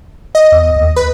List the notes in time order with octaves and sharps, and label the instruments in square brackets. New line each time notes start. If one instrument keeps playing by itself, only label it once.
[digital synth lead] D#5
[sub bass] E2
D#2
[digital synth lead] B4